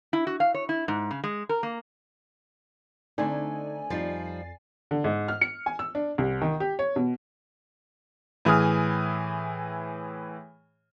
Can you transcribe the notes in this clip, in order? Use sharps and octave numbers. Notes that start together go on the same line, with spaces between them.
E4
F#4
F5
C#5
E4
G#2
C#3
G#3
A#4
A#3
D3 A3 C4 D4 D#4 D5 G#5
F2 F3 G3 D#4 A6 C7
D3
G#2
F6
C#7
G#5
E6
D4
C2
D#3
G4
C#5
B2
A2 E3 G#4 D#6 F6